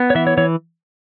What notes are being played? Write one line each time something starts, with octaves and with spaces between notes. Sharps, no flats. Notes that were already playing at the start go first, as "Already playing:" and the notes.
Already playing: B3
C#5
E3 E5
C#5
E3 C#5